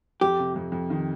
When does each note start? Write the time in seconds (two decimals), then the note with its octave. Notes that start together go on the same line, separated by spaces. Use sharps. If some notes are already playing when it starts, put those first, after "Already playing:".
0.21 F2 G4
0.39 C3
0.56 F2
0.72 F2
0.90 D#3